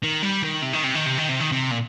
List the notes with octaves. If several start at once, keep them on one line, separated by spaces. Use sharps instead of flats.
D#3
G3
D#3
C3
D#3
C3
D#3
C3
D#3
C3
D#3
C3
A#2